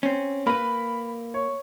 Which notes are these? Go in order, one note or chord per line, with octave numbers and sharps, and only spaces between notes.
C4 C#4
A#3 B4 B5
C#5